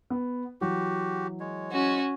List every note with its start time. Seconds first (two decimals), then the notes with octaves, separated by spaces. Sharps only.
0.10 B3
0.61 E3 F#3 F#4 G4
1.40 G#3 C#5
1.72 C#4 F#4